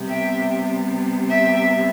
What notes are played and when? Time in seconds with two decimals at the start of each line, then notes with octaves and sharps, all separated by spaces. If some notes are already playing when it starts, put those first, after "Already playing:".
Already playing: C3 G3 B3
0.08 E5 G5
1.29 E5 G5